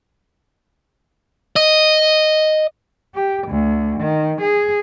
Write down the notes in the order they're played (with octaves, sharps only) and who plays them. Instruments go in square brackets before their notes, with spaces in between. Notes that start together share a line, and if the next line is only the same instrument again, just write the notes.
[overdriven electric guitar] D#5
[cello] G4
D2
D#3
G#4